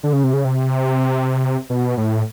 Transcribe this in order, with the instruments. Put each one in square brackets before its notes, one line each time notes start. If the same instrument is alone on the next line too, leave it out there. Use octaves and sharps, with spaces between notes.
[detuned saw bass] D3
C#3
C3
C#3
C3
B2
A2